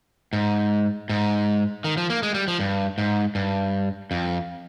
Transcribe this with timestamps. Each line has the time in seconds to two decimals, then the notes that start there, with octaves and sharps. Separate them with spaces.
0.33 G#2
1.09 G#2
1.84 D#3
1.97 F3
2.10 A#3
2.23 G#3
2.34 G3
2.48 F3
2.60 G2
2.98 G#2
3.35 G2
4.11 F2